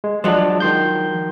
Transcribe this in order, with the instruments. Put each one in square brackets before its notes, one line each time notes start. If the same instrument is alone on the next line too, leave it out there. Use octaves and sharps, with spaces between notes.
[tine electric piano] G#3
[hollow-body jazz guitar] F3 F#3 [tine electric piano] G#3 D4
[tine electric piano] D#3 C6 G6